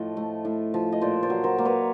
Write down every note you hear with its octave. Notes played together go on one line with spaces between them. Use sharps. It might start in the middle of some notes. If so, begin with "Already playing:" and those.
Already playing: A2 F3 D#5
A3
A2
F3
D#5
A#2 C5 D5
C5 D5
F#3
A#4 C5
A#3
B4 C#5